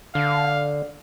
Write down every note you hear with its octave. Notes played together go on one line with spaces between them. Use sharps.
D3 F5